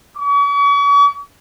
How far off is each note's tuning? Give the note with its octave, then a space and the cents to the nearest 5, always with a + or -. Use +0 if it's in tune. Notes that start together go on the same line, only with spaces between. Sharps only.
C#6 +45